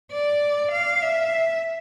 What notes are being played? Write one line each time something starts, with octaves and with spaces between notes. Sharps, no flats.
D5
F5
E5